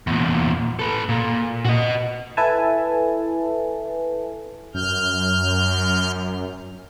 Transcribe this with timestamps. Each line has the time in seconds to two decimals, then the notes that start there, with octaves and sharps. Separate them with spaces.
0.07 E2 A#2
0.79 A4 B4
1.09 A#2
1.65 F#4 D#5
2.37 E4 A4 B4 E5 G#5 A5
4.74 F#2 F6 G6